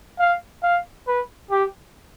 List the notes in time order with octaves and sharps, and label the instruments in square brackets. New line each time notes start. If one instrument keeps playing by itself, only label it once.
[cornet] F5
F5
B4
G4